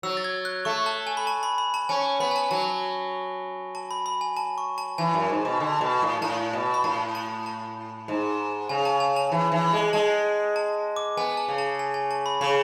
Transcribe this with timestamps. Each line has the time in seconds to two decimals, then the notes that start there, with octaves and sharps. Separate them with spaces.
0.03 F#3 E6
0.17 A6
0.24 G#6
0.45 F#6
0.65 A3 C#6
0.86 A5
1.07 G#5
1.17 B5
1.27 A5
1.43 B5
1.58 B5
1.74 A5
1.89 C#4 G#5
2.20 B3 B5
2.31 G#5
2.36 A5
2.51 F#3 A5
3.75 A5
3.91 B5
4.06 B5
4.21 G#5
4.37 A5
4.58 C#6
4.78 A5
4.98 E3 G#5
5.14 F#2
5.29 G#2
5.45 B2
5.60 D3
5.81 B2
6.02 A2
6.22 A2 A5
6.53 B2
6.74 B5
6.84 A2 A5
7.15 A5
7.46 A5
8.08 G#2
8.69 C#3 G#5
8.85 A5
9.00 G#5
9.16 A5
9.32 E3
9.52 E3
9.73 G#3
9.93 G#3 A5
10.56 A5
10.96 D6
11.17 B3 G#5
11.37 A5
11.48 C#3
11.58 A5
11.79 G#5
11.94 G#5
12.11 A5
12.26 B5
12.41 C#3 B5